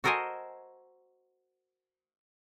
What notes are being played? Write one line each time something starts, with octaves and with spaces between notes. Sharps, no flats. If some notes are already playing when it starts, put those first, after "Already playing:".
F#4 A4 A#4 C5 D#5 G#5